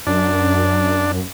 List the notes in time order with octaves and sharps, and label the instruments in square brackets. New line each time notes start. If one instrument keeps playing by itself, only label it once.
[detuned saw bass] F#2 [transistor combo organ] D4